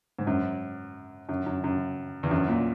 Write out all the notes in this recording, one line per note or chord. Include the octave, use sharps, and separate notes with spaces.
G#2
F#2
F#2
F#2
F#2
E2
F#2
A#2